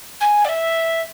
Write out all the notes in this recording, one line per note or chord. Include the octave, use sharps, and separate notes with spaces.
G#5
D5
E5